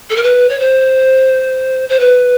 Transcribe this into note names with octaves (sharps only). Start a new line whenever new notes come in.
A4
A#4
B4
C#5
C5
C5
B4